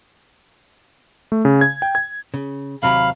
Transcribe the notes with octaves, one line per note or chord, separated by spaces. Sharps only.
A3
C#3
G#6
G5
G#6
C#3
D#2 C3 F#3 F5 B5